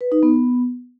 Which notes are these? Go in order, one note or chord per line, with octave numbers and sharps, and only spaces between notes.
B4
D#4
B3